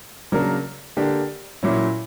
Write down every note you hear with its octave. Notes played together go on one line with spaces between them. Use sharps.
C#3 F#3 A#3 D4 A#4
D3 A#3 D4 G4
A#2 F#3 C#4 E4